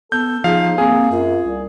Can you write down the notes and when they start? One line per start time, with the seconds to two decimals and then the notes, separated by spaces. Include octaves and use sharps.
0.12 B3 A4 G6
0.44 F3 D#4 G#4 F5
0.78 A#3 C4 G#4
1.11 F#2 F4
1.42 C2